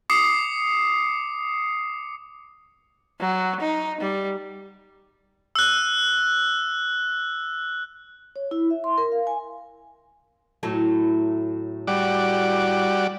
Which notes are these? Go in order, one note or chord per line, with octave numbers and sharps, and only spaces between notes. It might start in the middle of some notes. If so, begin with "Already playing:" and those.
D6 D#6 C7 C#7
F#3
D#4
G3
E6 F#6
C#5
E4
E5
C6
A#4
F5
G#5
A2 F#3 A3
G3 F#4 D5